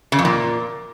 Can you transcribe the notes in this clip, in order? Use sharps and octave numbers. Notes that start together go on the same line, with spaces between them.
C#3
F2
A#2